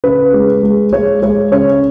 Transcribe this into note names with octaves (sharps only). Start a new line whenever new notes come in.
C#3 B4
G#3
G#3
G#3 C#5
G#3 C#5
C#3 C#5